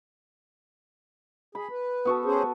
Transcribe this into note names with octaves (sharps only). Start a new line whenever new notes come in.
G#4 B5
B4
B3 F#4 A4
C#4 G#4 C5